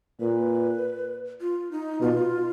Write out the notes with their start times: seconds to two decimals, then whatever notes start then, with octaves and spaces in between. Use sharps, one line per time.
0.20 A#2 B4
1.40 F4
1.71 D#4
2.01 B2 F4